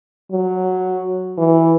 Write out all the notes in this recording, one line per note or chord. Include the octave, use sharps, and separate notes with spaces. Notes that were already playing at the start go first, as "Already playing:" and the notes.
F#3
E3